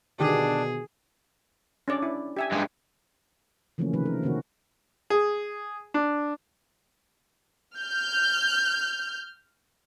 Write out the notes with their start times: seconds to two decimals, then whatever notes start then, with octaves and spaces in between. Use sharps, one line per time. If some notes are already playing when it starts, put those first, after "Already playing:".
0.20 B2 D3 D#3 D4 G4 G#4
1.88 C#4 D4 D5
2.02 E4
2.37 G4 E5 G#5
2.52 G2 G#3
3.78 C#3 E3 F3 A3 A#3 C#4
3.93 C3 D#3 F3 A3 B4
4.06 A#4
4.22 C3 D#3 A#3 C#4 F#4
5.10 G#4
5.94 D4
7.78 F6 G6